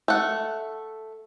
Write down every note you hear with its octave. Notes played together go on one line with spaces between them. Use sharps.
A3 F#5